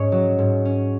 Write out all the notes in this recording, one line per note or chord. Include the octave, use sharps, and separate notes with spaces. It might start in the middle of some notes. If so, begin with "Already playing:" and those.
Already playing: G#2 C#4 C#5 D#5
F#3
G#2
C#4